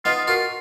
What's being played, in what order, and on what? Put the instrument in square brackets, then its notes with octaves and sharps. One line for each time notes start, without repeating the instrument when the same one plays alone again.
[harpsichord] B3 D#4 [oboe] F4
[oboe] F4 [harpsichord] F#4 A#4